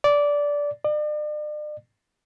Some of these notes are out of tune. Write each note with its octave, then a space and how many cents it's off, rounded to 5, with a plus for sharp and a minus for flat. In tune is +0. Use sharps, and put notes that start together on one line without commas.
D5 -15
D5 +40